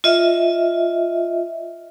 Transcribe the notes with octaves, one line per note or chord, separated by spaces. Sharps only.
F4 D#5 E5